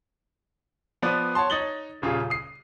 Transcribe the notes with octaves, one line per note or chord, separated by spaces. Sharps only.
F3 B3 B4 D5
C#5 F#5 A5 C6
D#4 C#5 A6 F#7 G7
D#1 C#3 F4 G#4
D#6 C7